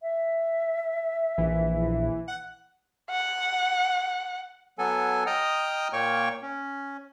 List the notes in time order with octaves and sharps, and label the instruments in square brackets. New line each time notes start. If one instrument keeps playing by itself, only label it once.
[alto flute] E5
[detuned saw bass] A#1 [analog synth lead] E3
[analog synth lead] F#5
[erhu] F#5
[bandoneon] F#3 B3 A4 G#5
D#5 G5 A#5 D#6 F6
A#2 A#3 C#5 G5 C#6
C#4